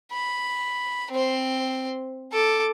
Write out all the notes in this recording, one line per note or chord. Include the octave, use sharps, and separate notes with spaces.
B5
C4 C5
A4 D6